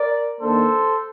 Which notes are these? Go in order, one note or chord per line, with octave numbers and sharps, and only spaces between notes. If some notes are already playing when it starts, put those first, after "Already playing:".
Already playing: A#4 D5
D#3 A#3 D4 A4 C5